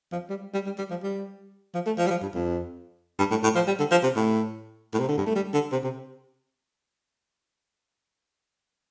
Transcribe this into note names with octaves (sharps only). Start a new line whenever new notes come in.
F3
G3
G3
G3
G3
F3
G3
F3
A3
F3
G3
F3
G2
F2
G2
A2
A2
F3
G3
D3
F3
C3
A2
A2
C3
D3
G2
A3
G3
D3
C3
C3